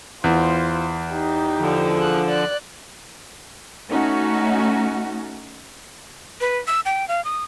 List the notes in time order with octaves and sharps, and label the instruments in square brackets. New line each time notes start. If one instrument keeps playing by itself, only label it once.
[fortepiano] E2 [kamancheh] F4 C5
[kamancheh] D#4 G4
[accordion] D3 F3
[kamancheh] G#4 F#6
D5 F#6
[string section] A3 C#4 D#4 F#4
[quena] B4
E6
G5
F5
D#6